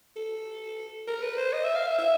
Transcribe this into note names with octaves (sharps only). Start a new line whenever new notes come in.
A4
A#4
B4
C5
D#5
E5
F5
E5
E5